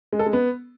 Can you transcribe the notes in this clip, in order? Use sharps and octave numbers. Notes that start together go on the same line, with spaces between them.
G#3
A4
G#3
B3